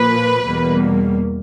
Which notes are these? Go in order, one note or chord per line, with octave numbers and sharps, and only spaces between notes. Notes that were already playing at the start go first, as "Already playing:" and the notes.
Already playing: A#2 F3 A#3 B4
E2 B2 G3 A#3